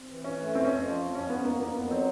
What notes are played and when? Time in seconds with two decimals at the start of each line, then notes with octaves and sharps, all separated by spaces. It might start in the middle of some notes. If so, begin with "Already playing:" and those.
Already playing: C4
0.09 E3
0.24 E3 C#4
0.39 A3
0.54 F2 C4
0.65 F2 C#4
0.85 F3
1.00 F2
1.15 F2 C#4
1.30 F2 B3
1.45 F2 A#3
1.60 F2 A#3
1.75 F2 B3
1.90 F#3 C4